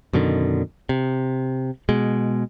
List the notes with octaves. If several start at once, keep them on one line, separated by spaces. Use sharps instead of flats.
F#2 B2 D3 D#3
C3
B2 G#3